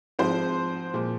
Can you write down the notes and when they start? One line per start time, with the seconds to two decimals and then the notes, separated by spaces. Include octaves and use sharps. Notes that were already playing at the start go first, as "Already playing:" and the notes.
0.19 G#2 F3 G#3 C4 C5
0.94 A#2 F3 G#3